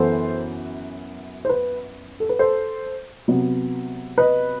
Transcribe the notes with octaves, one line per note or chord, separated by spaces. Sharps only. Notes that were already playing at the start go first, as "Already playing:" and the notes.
Already playing: F#2 E3 B3 A4 C5
C5
B4
A4
B4
A4 C5
C3 F#3 B3
B4 D#5